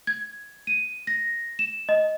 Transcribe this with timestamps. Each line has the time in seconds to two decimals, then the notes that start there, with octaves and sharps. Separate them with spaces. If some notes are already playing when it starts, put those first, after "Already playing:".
0.07 G#6
0.67 D#7
1.07 A#6
1.59 E7
1.89 D#5